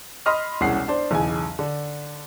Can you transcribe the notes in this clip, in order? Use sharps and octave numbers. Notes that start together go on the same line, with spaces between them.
D#5 B5 C6 D#6 F6
E1 C2 C#4 G#4 F#5 C7
D4 C5
B1 E2 C#3 G#5
D3